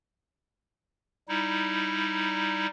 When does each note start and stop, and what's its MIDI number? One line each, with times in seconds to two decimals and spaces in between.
1.29 2.67 55
1.29 2.67 63
1.29 2.67 64